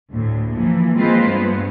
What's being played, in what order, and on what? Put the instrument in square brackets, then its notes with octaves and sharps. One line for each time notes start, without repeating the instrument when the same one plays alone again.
[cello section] D2 A2
E3 F3 A#3
G#3 A#3 C4 F4 B4 C5
G2 A3 B3